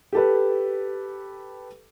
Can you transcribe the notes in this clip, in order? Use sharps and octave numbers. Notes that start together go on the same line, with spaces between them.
G4 A4 B4